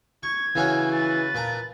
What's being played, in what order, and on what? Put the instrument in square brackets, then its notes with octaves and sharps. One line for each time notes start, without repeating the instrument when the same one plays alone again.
[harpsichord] C#6 [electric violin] G#6
[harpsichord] C#3 C#4 F#4 [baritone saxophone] E3
[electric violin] B4 A6
[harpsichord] A#2 A5 A#5